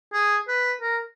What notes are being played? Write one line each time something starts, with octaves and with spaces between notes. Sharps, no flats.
G#4
B4
A#4